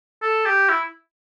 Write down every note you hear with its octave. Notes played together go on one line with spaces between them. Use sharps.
A4
G4
E4